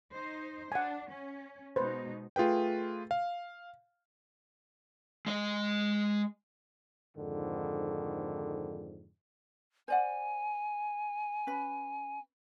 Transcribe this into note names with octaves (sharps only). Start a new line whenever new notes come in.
D#4 C5
D4 F#5 G#5
C#4
B2 G#3 D#4 B4 C5
A3 F4 G#4 B4 G5
F5
G#3 D#5
F2 G#2 D3 D#3
C5 D5 F#5 G#5
C#4 B4 B5